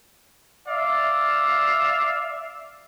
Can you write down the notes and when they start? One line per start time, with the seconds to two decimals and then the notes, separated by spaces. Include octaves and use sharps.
0.68 D5 E5 F5